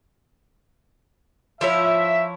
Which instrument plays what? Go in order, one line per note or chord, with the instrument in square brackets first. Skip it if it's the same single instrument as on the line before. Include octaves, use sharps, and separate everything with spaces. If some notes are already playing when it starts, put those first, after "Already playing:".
[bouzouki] F3 E4 C#5 [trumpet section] E5